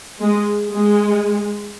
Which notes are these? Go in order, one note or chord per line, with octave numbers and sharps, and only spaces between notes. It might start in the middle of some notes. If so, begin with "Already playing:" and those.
G#3
G#3